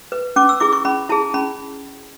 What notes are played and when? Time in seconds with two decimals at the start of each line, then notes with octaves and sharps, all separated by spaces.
0.12 B4
0.36 C#4 D6
0.49 E6
0.60 E4 G#4 D6
0.72 C#6
0.85 C#4 B5
1.09 E4 G#4 A5
1.34 C#4 B5